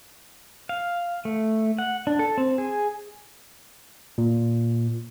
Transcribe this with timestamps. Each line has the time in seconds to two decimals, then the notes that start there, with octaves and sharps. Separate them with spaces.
0.69 F5
1.25 A3
1.78 F#5
2.07 D4
2.19 A4
2.38 C4
2.58 G#4
4.18 A#2